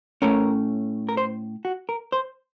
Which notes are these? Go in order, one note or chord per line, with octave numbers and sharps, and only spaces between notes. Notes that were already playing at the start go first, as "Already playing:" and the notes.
A2 A3 C#4 A#4
A#4
C5
F#4
A#4
C5